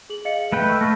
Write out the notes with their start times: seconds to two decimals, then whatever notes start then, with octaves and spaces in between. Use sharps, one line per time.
0.10 G#4 F#7
0.25 D#5 F5 C#7
0.52 A3 B4 G5
0.69 C#6 E6
0.81 A3 C#6 F6 A#6